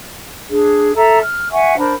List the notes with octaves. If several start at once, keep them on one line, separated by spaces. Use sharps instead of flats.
D4 G#4
A4 E5 A#5
F6
E5 F#5 G#5 C#6
D4 A#4 C5 B5